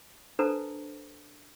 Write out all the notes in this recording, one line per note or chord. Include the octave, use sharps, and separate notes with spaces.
D4 A4 B4 C5 A5 A#5